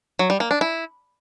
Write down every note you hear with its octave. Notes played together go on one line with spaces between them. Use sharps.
F#3
G3
A#3
D4
E4